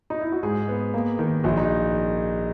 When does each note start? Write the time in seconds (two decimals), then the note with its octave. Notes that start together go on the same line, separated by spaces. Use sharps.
0.10 D#4
0.21 E4
0.32 F#4
0.43 G#2 G#4
0.68 B3
0.94 A#3
1.19 D#3
1.44 A#1 F#4
1.57 D#4